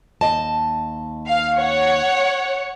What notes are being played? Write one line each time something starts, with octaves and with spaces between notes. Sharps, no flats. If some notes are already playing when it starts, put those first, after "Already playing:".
D#2 D#5 A5
F5
C#5 F#5